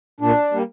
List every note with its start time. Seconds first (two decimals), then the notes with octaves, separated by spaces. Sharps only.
0.21 A#2 D4
0.52 G3 A#3